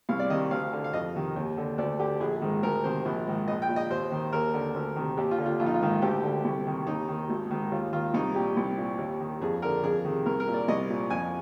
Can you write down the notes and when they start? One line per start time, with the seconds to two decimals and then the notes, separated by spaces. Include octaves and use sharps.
0.09 C2 F5
0.19 D5
0.30 C3 D#3 D#5
0.51 D2 F5
0.73 D3
0.84 F5
0.93 F2 D#5
1.15 C3 D#3
1.36 D#2
1.57 D3
1.78 D2 D5
1.99 D3 G4
2.20 A#1 G#4
2.42 G#2 D#3
2.63 D2 A#4
2.84 C3 D#3 C5
3.05 A#1
3.26 G#2 D#3
3.48 A#1 D#5
3.62 G5
3.69 A#2
3.76 D#5
3.90 D#2 C5
4.12 D#3
4.33 D#2 A#4
4.54 D3
4.75 D2
4.96 C3 D#3
5.17 D#2 G4
5.31 F4
5.38 D3
5.46 F4
5.60 A#1 F4
5.66 D#4
5.74 F4
5.81 G#2 D#3
6.02 D2 G4
6.23 D3
6.45 C2
6.66 C3 D#3
6.87 D#2 D#4
7.08 D#3
7.29 G#1
7.51 G#2 D#3
7.72 D#2 F4
7.93 D#3 F4
8.14 C2 D#4
8.35 A#2 G4
8.57 C2
8.78 A#2
8.98 D#2
9.20 D#3
9.41 F2 G#4
9.62 D3 A#4
9.83 F2 G#4
10.05 C3 D#3
10.26 C2 A#4
10.40 A#4
10.47 A#2
10.54 D5
10.68 C2 D#5
10.90 A#2
11.10 F2 G#5